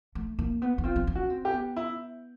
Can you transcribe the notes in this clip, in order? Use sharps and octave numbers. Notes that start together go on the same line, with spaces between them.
A3
A#3
B3
B3
C4 F4
C4
C#4
F#4
C4
G4
B3
E4